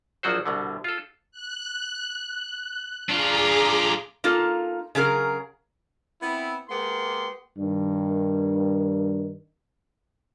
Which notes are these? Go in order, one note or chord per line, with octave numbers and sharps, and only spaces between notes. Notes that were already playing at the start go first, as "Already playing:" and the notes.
A#1 F3 F#3 F#4 C5
C2 B2 D3
F4 A4
F#6
D4 F4 G#4 A#5 D6
A#3 D#4 F4 A4
C#3 F#3 G#4 A#4
B3 C4 E4
G#3 A#3 B3 G4 C6
G2 D#3